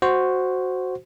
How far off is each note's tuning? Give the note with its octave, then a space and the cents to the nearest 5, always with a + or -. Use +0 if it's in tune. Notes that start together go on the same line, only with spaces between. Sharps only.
F#4 +0 C5 +0